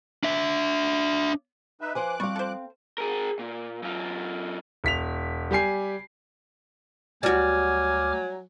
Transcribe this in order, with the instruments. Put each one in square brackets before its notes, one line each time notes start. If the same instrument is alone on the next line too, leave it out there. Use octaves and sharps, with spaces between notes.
[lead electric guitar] D4 E5
[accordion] D#4 B4 E5
[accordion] F3 D6 F#6 [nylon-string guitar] B4 C5 G#5
[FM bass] G3 [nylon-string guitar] C4 F5 [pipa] C#6
[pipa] A4 C5
[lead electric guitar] G#4 A#4
A#2
F#2 F4
[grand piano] E1 B6 F7
G3 G4 G#5 C7
[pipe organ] D2 D6 F6 [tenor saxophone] F#3 [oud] G3 F#4 [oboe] G#5